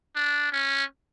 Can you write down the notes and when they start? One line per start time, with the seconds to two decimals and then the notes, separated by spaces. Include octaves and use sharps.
0.15 D4
0.52 C#4